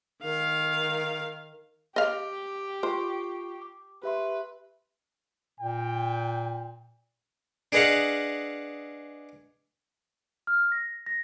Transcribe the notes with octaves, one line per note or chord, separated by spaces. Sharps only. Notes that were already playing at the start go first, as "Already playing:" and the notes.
D#3 F5
G4 D#5 F5
F4 C5 C#6 C7
D6
G4 B4 E5 C6
A#2 G5
D4 G#4 B4 D#5 F5 F#5
F6
A#6
A#6